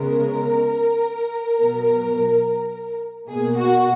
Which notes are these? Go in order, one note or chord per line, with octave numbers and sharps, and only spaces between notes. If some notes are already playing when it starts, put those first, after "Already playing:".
Already playing: C#3 G#3 B3 A#4
B2 F#3 B3
B2 A#3 G#4
F#4